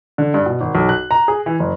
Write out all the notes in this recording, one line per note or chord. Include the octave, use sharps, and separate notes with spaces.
D3
G2
B2
G#1
B1
F#6
A#5
G#4
E3
F#1